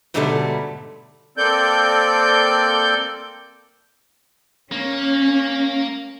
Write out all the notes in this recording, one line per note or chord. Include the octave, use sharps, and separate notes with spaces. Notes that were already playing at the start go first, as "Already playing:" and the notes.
G#2 B2 D3 F#3 G3 A3
A#3 C4 A4 D5 G6
A#3 C#4